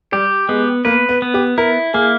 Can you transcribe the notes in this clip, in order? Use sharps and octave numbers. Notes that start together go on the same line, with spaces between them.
G3 G4
G#3 B3
A#3 B4
B3
B3
G4
E4 A#4
A#3 G#4